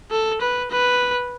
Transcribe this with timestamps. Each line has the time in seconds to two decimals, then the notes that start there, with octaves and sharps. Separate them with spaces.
0.11 A4
0.41 B4
0.71 B4